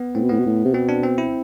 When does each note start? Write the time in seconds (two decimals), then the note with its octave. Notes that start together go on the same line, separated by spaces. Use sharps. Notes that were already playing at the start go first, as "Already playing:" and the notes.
Already playing: B3
0.15 A2 C4
0.23 B2
0.29 A2 B3
0.39 B2
0.46 A2
0.65 C3
0.74 B2 C4
0.89 D4
1.04 C4
1.18 E4